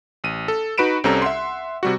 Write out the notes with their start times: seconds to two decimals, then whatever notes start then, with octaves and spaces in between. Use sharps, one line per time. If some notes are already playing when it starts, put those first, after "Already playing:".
0.24 A1 D#7
0.48 A4
0.78 D#4 F#4 B4 B5 D7 E7
1.04 C2 G3 C4 C#4 A4 A#5
1.22 E5 F#5 C6
1.83 C3 G3 F#4